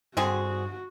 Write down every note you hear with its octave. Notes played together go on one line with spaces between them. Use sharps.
G2 D3 C4 F#4 G#4